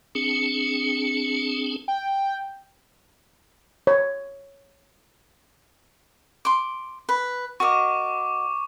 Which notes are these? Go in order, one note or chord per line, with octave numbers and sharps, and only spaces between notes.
C4 D4 G#4 C#7
G5
C#5
C6 D6
B4
F#4 A#4 D#5 C#6 D6